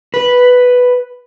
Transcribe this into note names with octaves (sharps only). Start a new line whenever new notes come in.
B4